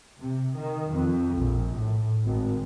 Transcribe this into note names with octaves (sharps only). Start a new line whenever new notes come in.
C3
D#3
F2
A#1
A2
G#1